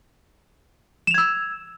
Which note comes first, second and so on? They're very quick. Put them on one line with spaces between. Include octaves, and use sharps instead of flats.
E7 F7 G#6 E6